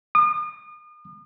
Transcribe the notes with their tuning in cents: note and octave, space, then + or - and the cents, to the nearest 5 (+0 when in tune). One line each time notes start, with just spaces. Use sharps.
D#6 -40